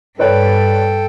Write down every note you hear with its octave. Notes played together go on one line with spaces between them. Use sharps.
G2 A4 B4 C#5 D5 G5